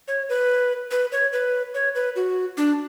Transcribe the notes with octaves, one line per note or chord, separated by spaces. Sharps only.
C#5
B4
B4
C#5
B4
C#5
B4
F#4
D4